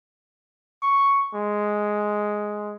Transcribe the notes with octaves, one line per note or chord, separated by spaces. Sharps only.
C#6
G#3